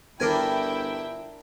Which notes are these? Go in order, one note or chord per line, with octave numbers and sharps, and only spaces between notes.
G1 D4 E4 A#4 G5 G#5